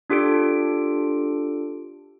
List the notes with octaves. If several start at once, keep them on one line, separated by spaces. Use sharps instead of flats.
D4 F4 G4 A4 D7